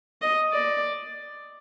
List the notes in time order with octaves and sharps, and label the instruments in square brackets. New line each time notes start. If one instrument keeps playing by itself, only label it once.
[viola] D#5
D5